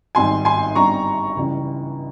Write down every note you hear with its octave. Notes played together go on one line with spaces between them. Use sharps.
G#1 G#2 G3 C4 G#5 C6
G#5 C6
G1 G2 G3 C4 A#5 C#6
C#2 C#3 E3 G3